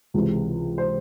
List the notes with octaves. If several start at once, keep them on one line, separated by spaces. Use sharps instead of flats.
C#2 C3 E3 G#3
C5